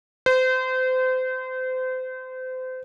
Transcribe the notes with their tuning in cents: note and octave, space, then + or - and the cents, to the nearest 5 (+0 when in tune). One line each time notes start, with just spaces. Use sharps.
C5 -30